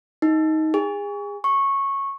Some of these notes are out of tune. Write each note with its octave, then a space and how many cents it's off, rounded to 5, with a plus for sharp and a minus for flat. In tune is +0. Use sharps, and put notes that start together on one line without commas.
D#4 +15
G#4 -30
C#6 -15